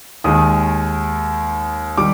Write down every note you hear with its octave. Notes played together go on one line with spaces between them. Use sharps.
D#2 D#3 G#3 D#6
D#3 G3 D6